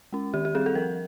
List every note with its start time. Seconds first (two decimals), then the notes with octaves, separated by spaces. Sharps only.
0.13 G#3 C#4
0.34 D#3 G4
0.45 G4
0.55 G3 C4 G#4
0.66 A4
0.75 F3 A#4